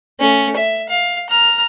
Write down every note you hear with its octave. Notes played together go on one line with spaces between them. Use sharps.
A3 C#4
E5
F5
A#5 F6